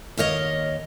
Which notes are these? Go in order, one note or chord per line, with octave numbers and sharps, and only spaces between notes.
D#2 A#4 C#5 D#5 F5